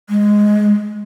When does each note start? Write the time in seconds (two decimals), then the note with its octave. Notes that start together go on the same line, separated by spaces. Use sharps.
0.10 G#3